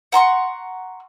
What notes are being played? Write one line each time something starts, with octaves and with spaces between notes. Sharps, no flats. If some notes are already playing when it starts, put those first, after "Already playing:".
F#5 A#5 C6 C#6